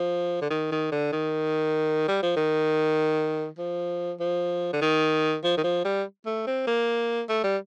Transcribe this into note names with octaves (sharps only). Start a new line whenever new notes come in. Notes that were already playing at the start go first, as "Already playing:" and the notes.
Already playing: F3
D3
D#3
D#3
D3
D#3
G3
F3
D#3
F3
F3
D3
D#3
F3
D#3
F3
G3
A3
C4
A#3
A3
G3